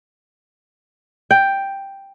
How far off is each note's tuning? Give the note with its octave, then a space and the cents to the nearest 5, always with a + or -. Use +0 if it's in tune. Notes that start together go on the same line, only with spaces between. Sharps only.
G5 +5